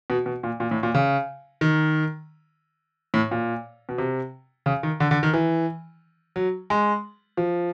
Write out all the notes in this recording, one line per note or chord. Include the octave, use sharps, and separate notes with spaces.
B2
B2
A#2
A#2
A2
A#2
C#3
D#3
A2
A#2
B2
C3
C#3
D#3
D3
D3
D#3
E3
F#3
G#3
F3